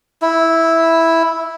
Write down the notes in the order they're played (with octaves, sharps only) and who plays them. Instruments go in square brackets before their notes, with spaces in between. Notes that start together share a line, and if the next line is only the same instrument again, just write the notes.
[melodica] E4